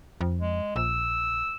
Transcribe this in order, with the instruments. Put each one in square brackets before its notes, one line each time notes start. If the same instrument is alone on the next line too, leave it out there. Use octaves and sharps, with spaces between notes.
[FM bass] F2
[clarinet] G#3
[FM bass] A#1 [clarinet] E6